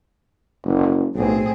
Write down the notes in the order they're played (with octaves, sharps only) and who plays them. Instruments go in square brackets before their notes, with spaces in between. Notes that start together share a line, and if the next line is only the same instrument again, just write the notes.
[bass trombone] F#1
[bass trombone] B1 [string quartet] A2 C4 G#4